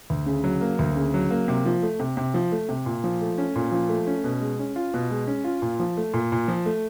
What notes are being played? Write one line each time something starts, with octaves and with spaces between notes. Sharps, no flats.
D2
C#3
F#3
A#3
D2
C#3
F#3
A#3
C3
F3
A3
C3
C3
F3
A3
C3
A#2
F3
A3
C#4
A#2
F3
A3
C#4
B2
G#3
C#4
F4
B2
G#3
C#4
F4
A#2
F3
A3
A#2
A#2
F3
A3